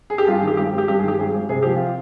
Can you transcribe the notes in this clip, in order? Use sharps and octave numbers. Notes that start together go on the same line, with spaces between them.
G#4
G4
G2 F4
G#4
D#3 G4
G#1 G4
G#1
G4
G2 G4
G#4
D#3 G4
G#1 G#4
G#1
C3 G#4
F3 G4
F4